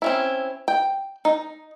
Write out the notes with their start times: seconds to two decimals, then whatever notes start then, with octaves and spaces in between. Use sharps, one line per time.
0.02 C4 C#4 E4
0.68 G5
1.25 D#4